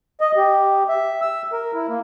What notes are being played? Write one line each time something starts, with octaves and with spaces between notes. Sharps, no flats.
D#5
G4
E5
E6
A#4
E4
A#3